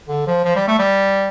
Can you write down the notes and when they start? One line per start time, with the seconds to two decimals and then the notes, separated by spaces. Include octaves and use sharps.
0.08 D3
0.27 F3
0.45 F3
0.56 G3
0.68 A3
0.79 G3